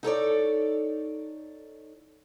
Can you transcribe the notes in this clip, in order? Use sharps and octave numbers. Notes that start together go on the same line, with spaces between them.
D#4 A4 C#5 D5